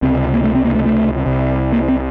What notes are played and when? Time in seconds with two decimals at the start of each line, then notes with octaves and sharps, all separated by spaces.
0.02 C#2 C3 C4
0.34 A#3
0.44 A3
0.55 C4
0.65 A#3
0.75 A3
0.86 A3
1.26 C2 C3
1.73 A#3
1.88 C4